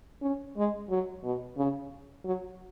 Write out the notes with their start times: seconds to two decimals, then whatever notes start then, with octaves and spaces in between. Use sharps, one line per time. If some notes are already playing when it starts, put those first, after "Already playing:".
0.22 C#4
0.56 G#3
0.90 F#3
1.24 B2
1.58 C#3
2.25 F#3